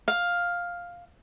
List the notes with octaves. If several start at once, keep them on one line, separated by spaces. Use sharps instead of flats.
F5